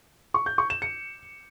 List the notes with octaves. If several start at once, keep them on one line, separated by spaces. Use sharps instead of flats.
C#6
G6
C#6
E7
C#7